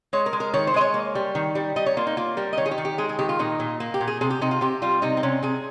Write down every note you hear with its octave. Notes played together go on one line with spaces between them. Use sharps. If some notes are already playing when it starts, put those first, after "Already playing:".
G#3 C#5
A#4
G#3
A#4
D#3 C#5
C5
G#3 D#5
C#5
A#3
G3
D#3
G3
G3 D#5
C#5
A#3 F4
D#4
A#3 F4
G3 A#4
D#5
D#3 C#5
G#4
G4
D#3
G4
G#3 G#4
G#4
D#3 G4
F4
A#2 D#4
A#2
A#3
G4
A#2
G#4
C3 G#4
G4
C3 D#4
F4
C3 G4
G3 F4
C3 D#4
C4
C3 C#4
C3 G#4